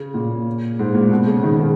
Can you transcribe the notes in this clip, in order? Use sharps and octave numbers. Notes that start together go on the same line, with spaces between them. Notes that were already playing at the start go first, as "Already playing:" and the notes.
Already playing: C#3
A#2
G#2
A#2
B2
C#3
D#3
C#3